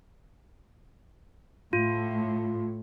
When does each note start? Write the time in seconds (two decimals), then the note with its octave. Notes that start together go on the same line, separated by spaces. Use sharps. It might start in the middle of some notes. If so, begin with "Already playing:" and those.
1.73 A2 F4